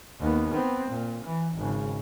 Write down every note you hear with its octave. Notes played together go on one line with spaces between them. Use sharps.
D#2 B3
B3 C4
A#2
E3
G#1 C#3